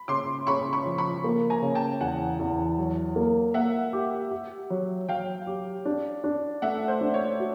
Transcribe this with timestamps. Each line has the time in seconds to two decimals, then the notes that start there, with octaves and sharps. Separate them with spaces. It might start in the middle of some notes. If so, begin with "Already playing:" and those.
Already playing: B5
0.08 C#3 C6 D6
0.47 C#3 B5 C#6
0.73 B5 C#6
0.86 F3
0.98 B5 C#6
1.24 A#3
1.50 G#5 A#5
1.62 C#3
1.75 G5 A5
2.00 E2 F#5 G#5
2.39 E2
2.78 F#3
3.16 A#3
3.54 A#3 E5 F#5
3.93 G4
4.31 G4
4.70 F#3
5.09 F#3 F5 G5
5.47 G4
5.85 D4
6.24 D4
6.62 A3 E5 F#5
6.88 C5
7.01 D4
7.14 C#5
7.40 F#4